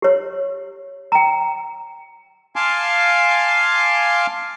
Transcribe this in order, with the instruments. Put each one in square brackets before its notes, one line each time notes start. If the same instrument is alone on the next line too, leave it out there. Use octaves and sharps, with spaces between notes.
[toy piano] G4 C#5
G5 A#5
[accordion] F5 G#5 A5 C6 D6